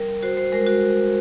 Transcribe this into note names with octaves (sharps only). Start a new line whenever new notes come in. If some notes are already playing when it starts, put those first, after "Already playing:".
Already playing: G3 A#4
F#4 C5
C5
G#3 A#4
F#4